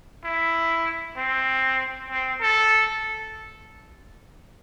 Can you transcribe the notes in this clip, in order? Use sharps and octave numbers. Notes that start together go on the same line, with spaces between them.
E4
C4
C4
A4